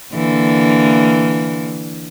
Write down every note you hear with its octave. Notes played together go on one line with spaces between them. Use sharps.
D3 E3 A#3